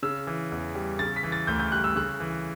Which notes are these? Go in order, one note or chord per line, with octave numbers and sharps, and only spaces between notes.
C#3 E6
E3
E2
G3
C#3 A6
B6
E3
A6
D2 G6
G6
G3 F#6
E6
C#3 F#6
E3